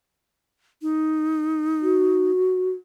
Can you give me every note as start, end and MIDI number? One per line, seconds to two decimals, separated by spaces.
0.82 2.31 63
1.82 2.71 66